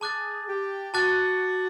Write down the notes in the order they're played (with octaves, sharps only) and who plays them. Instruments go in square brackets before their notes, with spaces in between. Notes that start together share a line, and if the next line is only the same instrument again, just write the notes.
[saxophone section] G#4 [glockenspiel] A5 D6 F#6 A6
[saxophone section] G4
[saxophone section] F#4 [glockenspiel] A5 D6 F#6 A6